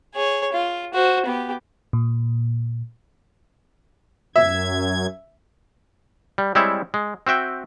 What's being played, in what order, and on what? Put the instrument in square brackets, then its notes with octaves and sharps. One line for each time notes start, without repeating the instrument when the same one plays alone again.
[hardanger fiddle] G#4 C#5
F4
F#4 C5
B3 G4
[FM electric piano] A#2
[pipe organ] F#2 G#6 [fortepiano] E5
[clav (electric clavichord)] G3
G3 G#3 C4 E4 C#5 E5
G#3
C4 F#4 E5 G5